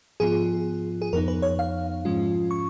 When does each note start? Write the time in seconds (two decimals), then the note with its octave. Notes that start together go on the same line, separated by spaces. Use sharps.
0.20 G#2 F3 B3 F4 G#4
1.02 G#4
1.13 F2 F3 B3 D#4 A#4
1.28 B4
1.42 C#5
1.59 F5
2.05 G#2 F3 G#3 C#4 F4
2.51 C#6